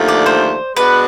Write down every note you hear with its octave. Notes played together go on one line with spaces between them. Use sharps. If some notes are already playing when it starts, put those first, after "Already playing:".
Already playing: D#2 D3 F3 A3
D5
C5
B2 G#3 B3 D4 F#4 B4